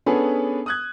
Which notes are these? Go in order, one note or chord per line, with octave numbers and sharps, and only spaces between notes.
B3 C#4 D4 G#4 A4 B4
D#6 F#6 G#6